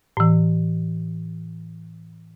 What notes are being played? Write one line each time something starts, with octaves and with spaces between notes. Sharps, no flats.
A2 E3